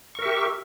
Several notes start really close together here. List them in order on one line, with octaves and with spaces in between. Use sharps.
C#6 A#4 E5 G4